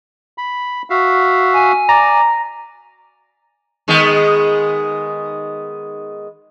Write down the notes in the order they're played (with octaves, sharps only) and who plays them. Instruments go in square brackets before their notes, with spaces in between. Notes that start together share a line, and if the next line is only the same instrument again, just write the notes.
[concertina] B5
F#4 E5 F5
[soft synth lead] G#5
[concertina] D5 [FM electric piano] A#5
[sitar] D#3 G#3 B3